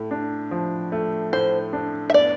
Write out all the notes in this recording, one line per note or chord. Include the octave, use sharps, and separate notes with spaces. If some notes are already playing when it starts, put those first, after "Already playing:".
Already playing: A2 A3
D4
F3
A3
A2 C5
D4
E5
B3 D5